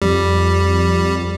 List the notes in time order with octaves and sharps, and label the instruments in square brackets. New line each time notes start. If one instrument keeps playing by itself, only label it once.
[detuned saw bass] F2 [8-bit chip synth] G3